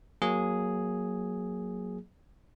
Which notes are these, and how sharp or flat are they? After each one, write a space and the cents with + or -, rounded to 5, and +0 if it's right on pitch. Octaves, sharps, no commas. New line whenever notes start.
F#3 -10 A#3 +0 G#4 +0